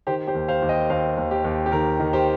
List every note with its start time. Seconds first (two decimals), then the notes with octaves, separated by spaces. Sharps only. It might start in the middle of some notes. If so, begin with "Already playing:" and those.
0.07 D#3 G4 C5
0.27 G4 C5
0.35 D#2
0.48 C5 F5
0.62 D#2
0.69 D#5 G5
0.90 D#2 C5 F5
1.17 D#2
1.31 G4
1.44 D#2
1.66 G4
1.72 D#3 A#4
2.00 D#3
2.13 G4 C5